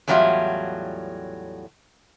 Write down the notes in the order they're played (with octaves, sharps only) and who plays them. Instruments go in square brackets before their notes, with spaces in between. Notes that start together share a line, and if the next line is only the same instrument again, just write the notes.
[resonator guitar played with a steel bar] E2 A2 F#3 G3 F4 E5